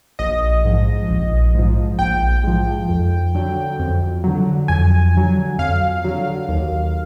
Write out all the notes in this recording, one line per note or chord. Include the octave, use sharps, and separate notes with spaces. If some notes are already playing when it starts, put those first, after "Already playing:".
A#1 D#5
G#2 F3
A#1
G#2 F3
A#1 G5
G#2 F3
F2
D3 F#3
F2
D3 F#3
F2 G#5
D3 F#3
F2 F5
D3 F#3
D#2